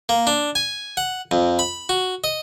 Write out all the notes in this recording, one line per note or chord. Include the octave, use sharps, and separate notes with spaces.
A#3
D4
G#5
F#5
F2
B5
F#4
D#5